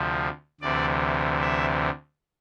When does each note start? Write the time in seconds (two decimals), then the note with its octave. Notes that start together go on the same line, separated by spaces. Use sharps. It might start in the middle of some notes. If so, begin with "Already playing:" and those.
Already playing: D2 C3 F3
0.61 D2 C3 E3 D5
1.41 E5